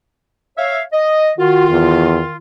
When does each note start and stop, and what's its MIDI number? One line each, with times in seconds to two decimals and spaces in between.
0.58 0.82 73
0.58 0.82 76
0.58 0.82 77
0.93 1.32 75
1.39 2.36 51
1.39 2.36 65
1.39 1.65 66
1.69 2.20 40